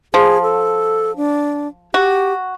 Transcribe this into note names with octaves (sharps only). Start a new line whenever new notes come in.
F3 G#4
A4
D4
F#4 G4